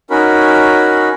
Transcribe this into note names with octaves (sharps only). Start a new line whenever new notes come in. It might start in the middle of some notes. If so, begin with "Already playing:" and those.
C#4 D#4 F#4 A#4 B5